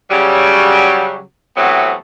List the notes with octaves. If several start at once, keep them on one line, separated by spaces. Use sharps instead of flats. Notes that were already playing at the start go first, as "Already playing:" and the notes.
C#3 F#3 G3
C3 E3 F#3 A3 B3 C4